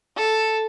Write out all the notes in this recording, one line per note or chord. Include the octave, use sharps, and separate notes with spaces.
A4